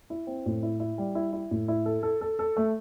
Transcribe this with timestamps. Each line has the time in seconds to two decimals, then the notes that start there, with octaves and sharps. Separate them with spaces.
0.10 E4
0.27 C4
0.46 A2
0.63 E4
0.80 E4
0.98 G3
1.15 E4
1.33 E4
1.51 A2
1.68 E4
1.86 A4
2.03 A4
2.21 A4
2.39 A4
2.57 A3